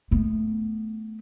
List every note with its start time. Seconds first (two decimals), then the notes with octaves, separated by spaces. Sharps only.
0.11 A3 B3